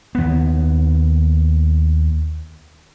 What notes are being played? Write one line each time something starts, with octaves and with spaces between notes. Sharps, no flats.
D#2 B3